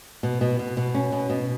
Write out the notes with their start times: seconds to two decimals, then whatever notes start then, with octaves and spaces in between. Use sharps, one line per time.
0.23 B2
0.41 B2
0.59 B2
0.77 B2
0.95 C#4
1.12 B2
1.30 B2